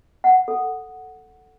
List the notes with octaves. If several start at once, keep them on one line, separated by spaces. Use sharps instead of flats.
F#5
A4